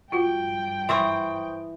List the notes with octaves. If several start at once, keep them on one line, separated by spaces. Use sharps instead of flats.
G2 F4 F#4 F#5 G5
E3 C5 C#6 D#6